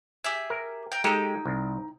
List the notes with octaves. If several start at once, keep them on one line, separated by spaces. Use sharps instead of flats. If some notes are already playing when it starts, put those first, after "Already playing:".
G4 G#4 E5
A#4
A#4 G5
G#3 D#4 G4 A4 G5
C2